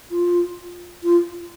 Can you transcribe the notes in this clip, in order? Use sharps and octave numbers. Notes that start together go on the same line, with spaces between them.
F4
F4